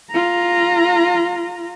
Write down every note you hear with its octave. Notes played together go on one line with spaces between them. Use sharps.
F4 A#5